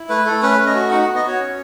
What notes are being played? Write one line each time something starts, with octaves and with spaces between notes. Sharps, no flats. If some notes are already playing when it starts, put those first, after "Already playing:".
Already playing: E4
A3 B4
A3 A4
C#4 B4
A3
D#5
F#4
D#4 F#5
B3 F#5
D#5
F#4 C#5
C#4